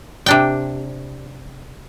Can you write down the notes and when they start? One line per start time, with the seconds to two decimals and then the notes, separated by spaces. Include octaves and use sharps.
0.26 C3 D4 G5